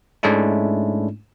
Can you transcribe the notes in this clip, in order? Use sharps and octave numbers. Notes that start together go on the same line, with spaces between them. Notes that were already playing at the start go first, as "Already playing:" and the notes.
G#2 G#3 A3 C#4 D4 E4